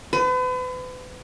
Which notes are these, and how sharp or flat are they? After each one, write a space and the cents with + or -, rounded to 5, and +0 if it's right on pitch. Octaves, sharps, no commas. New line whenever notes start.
B4 +40